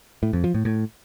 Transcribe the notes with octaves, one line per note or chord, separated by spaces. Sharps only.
A2
F2
F3
A2
A2